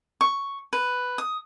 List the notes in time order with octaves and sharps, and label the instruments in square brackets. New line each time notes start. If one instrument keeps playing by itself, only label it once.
[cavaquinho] C#6
B4
D#6